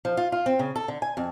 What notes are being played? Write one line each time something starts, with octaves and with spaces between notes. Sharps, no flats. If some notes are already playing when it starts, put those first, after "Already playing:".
F3
F4
F4
C4
C#3
A4
D3
G#5
F2